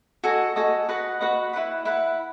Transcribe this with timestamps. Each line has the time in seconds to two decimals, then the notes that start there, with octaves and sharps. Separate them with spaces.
0.24 F#4 A4 D#5 G#5
0.56 F#4 A4 D#5 G#5
0.89 F#4 B4 D#5 F#5
1.21 F#4 B4 D#5 F#5
1.53 E4 B4 F#5 B5
1.85 E4 B4 F#5 B5